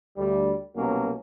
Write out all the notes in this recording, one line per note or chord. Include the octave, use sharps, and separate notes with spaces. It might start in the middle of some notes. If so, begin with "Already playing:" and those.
D2 G3
C2 B2 F#3 A#3 C#4